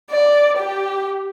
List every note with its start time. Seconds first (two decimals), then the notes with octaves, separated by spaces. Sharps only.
0.10 D5
0.57 G4